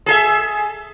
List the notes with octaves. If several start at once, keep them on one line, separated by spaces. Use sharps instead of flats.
G#4 A4 E5